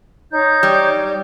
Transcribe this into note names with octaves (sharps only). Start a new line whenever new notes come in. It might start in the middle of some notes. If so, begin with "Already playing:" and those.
D#4 C#5 G6
G3